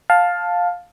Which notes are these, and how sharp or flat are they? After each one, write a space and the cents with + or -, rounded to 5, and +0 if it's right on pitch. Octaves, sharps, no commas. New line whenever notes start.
F5 +15 A5 +0